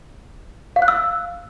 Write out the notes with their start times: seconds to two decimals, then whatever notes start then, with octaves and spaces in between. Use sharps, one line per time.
0.76 F5
0.82 F#6
0.88 E6